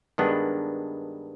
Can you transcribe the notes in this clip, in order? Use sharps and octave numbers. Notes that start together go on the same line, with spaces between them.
G2 D#3 G#3 B3 D4